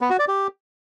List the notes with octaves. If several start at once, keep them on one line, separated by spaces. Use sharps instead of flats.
B3
F#4
D5
G4